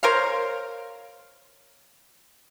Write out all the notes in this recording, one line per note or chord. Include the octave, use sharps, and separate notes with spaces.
A#4 C5 C#5 F5